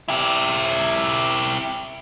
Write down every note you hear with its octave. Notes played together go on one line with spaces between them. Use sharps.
E4 G4